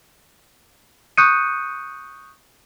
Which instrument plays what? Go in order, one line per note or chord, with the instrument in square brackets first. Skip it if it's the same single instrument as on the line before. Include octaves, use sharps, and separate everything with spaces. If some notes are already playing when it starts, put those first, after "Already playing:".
[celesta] C#6 D#6 F#6 G6 C#7 D#7